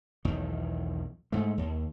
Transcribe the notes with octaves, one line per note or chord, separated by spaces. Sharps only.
B1 E2 D#3
G#2 A3
D#2